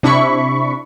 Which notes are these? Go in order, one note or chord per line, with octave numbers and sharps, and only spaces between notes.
C3 D4 E4 B5 C#6